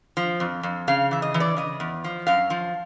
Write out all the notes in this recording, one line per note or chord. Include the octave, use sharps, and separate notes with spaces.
F3
F2
F2
C#3 F5
E3 E5
D#5
E3
D5
C#3 D#5
E2
F3
F#2 F5
F3